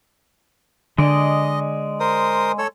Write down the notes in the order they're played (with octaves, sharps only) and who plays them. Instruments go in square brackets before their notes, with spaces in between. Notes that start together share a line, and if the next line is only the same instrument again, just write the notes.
[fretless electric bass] D3 [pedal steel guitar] G#3 D5 [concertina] D#5
[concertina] A#4 C5 D#6
A4 C#5 E6